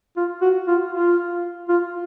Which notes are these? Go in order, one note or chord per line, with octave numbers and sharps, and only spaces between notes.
F4
F#4
F4
F4
F4